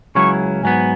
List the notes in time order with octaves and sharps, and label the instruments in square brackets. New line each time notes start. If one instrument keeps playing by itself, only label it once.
[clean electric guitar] C#2 C#3 F#3 C#4 E4 [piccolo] C#6
[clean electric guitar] G#2 F#3 B3 [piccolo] G#5